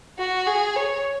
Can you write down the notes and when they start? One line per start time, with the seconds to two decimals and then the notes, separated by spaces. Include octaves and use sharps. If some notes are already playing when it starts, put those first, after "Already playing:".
0.19 F#4
0.47 G#4
0.76 C#5